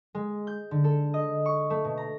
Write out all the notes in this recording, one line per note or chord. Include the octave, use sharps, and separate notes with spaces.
G#3
G6
D3
A4
D#5
C#6
A3
B2
A#5